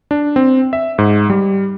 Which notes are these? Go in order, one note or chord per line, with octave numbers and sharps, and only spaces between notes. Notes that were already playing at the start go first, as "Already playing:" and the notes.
D4
C4
E5
G#2
G3